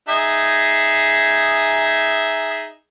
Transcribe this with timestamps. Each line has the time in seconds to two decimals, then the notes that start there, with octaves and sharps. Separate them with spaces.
0.09 D#4 G#4 E5